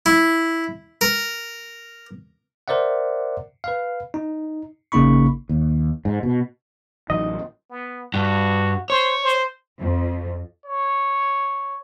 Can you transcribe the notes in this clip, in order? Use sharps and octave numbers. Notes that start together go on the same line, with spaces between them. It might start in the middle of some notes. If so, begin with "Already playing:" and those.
E4
A#4
A#4 C5 D5 E5 F#5
B4 F5
D#4
A1 C#3 A#3 D#4 B5 C#6
D#2
G#2
B2
A1 E3 F#3 D#4 D#5
B3
G2 F#4
C5 C#5
C5
F2
C#5